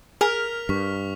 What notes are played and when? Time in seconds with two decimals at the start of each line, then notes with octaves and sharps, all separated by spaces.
0.21 G#4 A#4 F6 B6 F7
0.69 G2 C#6 B6